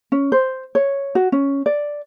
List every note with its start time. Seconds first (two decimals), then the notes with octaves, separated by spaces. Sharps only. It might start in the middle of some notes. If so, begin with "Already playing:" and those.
0.12 C#4
0.32 C5
0.75 C#5
1.15 F#4
1.32 C#4
1.66 D5